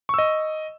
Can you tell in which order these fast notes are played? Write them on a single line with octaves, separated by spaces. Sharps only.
C#6 E6 D#5